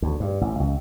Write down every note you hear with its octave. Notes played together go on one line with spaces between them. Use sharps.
D2
G2
A1
C#2